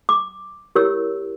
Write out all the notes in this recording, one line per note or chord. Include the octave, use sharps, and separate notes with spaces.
D6
E4 G4 A#4 C#5 E6